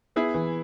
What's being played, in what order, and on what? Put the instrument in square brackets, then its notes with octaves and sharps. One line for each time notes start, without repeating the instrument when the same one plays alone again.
[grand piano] B3 [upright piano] E4 G#4
[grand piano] E3